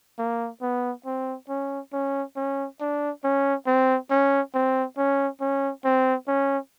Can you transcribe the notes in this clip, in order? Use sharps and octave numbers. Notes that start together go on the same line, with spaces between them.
A#3
B3
C4
C#4
C#4
C#4
D4
C#4
C4
C#4
C4
C#4
C#4
C4
C#4